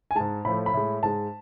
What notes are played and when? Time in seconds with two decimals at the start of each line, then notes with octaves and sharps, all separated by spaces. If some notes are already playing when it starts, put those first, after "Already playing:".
0.11 G#5
0.16 G#2 G#3 A5
0.45 A2 F3 A3 B5
0.66 B5
0.73 A2 G#3
1.03 G#2 G#3 A5